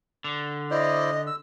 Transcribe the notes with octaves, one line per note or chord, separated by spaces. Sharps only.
D3
E4 C5 D5 D#5
E6